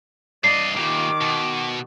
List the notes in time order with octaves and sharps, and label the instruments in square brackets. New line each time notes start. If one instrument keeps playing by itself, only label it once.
[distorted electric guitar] G2 D#5 [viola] D5 [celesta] C7
[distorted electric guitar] A#2 G3 [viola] D#3 D6
[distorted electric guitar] B2